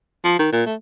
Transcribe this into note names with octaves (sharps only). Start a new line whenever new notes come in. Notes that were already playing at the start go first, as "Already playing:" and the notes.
F3
D#3
A#2
A3